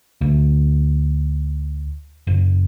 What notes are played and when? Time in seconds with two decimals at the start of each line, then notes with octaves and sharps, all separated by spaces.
0.21 D2
2.27 F#1